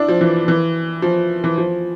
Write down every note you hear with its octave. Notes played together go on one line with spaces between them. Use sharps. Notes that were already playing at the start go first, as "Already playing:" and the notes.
Already playing: D4 E4
F3
E3
E3
F3
E3
F3